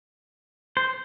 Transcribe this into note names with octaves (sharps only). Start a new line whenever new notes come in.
C5